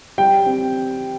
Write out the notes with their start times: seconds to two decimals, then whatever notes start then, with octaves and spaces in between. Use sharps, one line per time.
0.18 G3 G5
0.46 C4